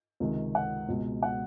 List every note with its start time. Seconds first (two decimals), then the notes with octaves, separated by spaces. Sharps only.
0.20 C#2 C3 D#3
0.55 F#5
0.89 C#2 B2
1.23 F#5